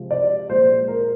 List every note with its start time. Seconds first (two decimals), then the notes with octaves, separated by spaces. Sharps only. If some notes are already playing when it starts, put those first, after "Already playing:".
Already playing: C3 F3 G#3
0.11 D5
0.49 A#2 F3 G#3 C5
0.88 A#4